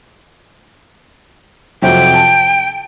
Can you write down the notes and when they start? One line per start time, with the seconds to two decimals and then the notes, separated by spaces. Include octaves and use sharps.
1.82 F2 C3 F#3 G5
2.14 A5